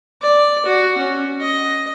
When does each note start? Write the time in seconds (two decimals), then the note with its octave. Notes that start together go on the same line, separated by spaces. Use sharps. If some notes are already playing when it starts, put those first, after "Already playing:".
0.22 D5
0.66 F#4
0.98 C#4
1.41 D#5